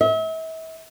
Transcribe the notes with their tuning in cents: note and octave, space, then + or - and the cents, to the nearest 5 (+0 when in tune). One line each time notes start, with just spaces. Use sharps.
E5 -40